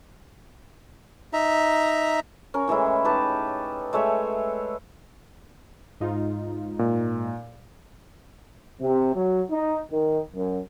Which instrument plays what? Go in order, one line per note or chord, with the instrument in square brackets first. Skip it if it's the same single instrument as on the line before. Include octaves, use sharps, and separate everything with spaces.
[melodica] D#4 E5 A#5
[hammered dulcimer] C#4 A#4
A2 E3 G#3 E4
D#4 G4 B4 A5
G#3 A3 C#5 E5
[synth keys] G#2 D#4 F4
[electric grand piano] A#2
[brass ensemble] C3
F#3
D#4
D#3
F#2